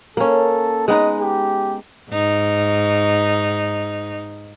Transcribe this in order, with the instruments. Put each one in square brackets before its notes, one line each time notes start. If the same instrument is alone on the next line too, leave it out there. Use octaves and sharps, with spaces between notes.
[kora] A#3 C#4 [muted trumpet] A4
[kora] G#3 B3 D#4 [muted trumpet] D#5
[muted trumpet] G4
[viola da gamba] G#2 D#4